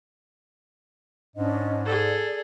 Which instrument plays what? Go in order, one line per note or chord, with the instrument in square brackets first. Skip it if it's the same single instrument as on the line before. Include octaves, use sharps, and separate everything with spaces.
[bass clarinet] G#2 [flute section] C#4 D4 D#5
[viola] G#4 A4 [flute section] D5